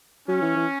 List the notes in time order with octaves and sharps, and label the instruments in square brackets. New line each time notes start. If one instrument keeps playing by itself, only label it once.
[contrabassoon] F#3 [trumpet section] C#4
[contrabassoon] E3
E3